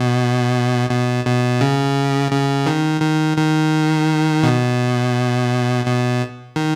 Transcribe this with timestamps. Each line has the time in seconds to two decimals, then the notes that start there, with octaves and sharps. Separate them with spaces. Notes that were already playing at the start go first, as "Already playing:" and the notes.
Already playing: B2
0.89 B2
1.25 B2
1.61 C#3
2.32 C#3
2.66 D#3
3.02 D#3
3.37 D#3
4.43 B2
5.86 B2
6.56 D#3